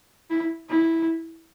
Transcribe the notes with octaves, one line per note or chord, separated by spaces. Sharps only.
E4
E4